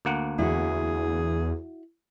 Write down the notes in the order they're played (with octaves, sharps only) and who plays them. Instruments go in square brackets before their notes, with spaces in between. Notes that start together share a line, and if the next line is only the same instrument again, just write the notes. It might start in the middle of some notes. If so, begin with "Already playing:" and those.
[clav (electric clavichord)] D2 A#3 F#5
[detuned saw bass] E2 [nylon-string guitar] E4 F#4 [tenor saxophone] G#4